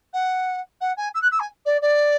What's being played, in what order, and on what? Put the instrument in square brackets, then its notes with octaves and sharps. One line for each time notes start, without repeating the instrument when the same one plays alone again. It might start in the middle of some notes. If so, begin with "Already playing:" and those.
[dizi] F#5
F#5
G#5
E6
F#6
E6
G#5
D5
D5